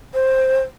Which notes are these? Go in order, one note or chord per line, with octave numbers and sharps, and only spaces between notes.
C5